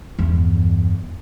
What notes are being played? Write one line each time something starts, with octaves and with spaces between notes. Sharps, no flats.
E2 G2